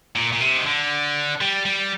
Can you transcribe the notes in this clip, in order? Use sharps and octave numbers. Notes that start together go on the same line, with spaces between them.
A#2
A#2
C3
D#3
D3
G3
G3